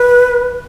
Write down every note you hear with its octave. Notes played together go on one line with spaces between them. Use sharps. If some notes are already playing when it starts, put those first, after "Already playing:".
Already playing: B4